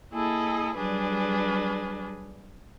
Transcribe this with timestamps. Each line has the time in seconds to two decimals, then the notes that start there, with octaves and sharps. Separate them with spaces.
0.12 A#3 E4 G#4 A4 D#5
0.76 F#3 G3 D4 G#4 B4